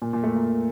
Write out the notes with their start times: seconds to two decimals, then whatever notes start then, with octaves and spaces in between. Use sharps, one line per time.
0.02 A#2
0.13 A#2
0.23 A3
0.35 A#3